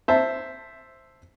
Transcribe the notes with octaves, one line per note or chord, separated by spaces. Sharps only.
C5 E5 A5